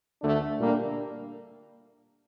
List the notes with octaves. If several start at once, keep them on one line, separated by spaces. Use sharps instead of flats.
D2 D3 A3 D4
A#2 G3 A#3 D4